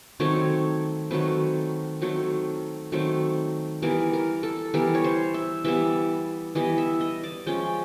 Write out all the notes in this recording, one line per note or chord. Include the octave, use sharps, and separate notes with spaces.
D#3 F#3 A3 C4 C#5
D#3 F#3 A3 C4 B4
D#3 F#3 A3 C4
D#3 F#3 A3 C4
E3 G3 B3 A#4
A#4
A4
E3 G3 B3 A#4
C#5
C5
E5
E3 G3 B3 E5
E3 G3 B3 D#5
E5
D#5
D5
F3 G#3 C#4 G5